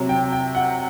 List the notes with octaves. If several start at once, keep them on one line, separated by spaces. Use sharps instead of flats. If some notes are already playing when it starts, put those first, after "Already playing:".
Already playing: C3 F#3
G5
G5
F#5